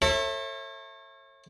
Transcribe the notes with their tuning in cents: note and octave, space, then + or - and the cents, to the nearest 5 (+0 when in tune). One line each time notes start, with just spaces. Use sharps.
A4 +35 C#5 -35 E5 -5